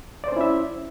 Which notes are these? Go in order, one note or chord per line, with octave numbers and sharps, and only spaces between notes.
C#4 E4 C5 D5 E5